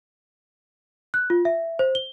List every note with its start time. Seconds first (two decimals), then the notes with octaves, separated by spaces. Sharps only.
1.14 F#6
1.30 F4
1.45 E5
1.79 C5
1.95 G7